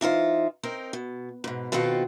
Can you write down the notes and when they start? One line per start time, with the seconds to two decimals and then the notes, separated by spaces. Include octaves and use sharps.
0.01 E3 D#4 F4 C5
0.63 C4 D#4 A#4
0.93 B2
1.44 G#2 B2
1.72 B2 D#3 C4 F4 F#4 A4